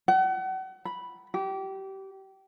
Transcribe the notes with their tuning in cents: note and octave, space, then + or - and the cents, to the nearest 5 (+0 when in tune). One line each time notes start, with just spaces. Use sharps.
F#5 +35
B5 -5
G4 -25